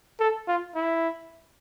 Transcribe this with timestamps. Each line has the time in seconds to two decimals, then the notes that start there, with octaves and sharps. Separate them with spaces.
0.20 A4
0.48 F4
0.75 E4